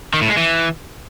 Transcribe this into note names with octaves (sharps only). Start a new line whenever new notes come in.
D#3
A2
G#3
E3